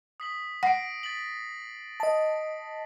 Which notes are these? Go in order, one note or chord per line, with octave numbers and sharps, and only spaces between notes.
D#6 B6 F#7
F#5 A#6 C7 D7
A6 B6 F#7
D#5 A5